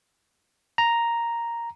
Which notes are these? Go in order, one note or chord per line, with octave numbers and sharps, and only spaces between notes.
A#5